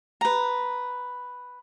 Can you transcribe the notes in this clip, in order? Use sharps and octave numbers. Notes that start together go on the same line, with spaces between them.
B4 A#5